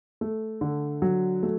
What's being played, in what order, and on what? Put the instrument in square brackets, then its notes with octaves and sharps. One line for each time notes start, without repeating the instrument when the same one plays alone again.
[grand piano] A3
D3
F#3
A3